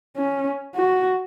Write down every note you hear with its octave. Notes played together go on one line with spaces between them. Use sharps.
C#4
F#4